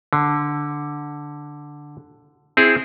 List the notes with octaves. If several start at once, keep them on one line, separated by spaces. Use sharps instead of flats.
D3
C4 E4 G#4